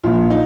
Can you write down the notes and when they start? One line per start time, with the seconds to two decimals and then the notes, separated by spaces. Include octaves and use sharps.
0.04 A#1 A#2 F3 F4
0.30 D#4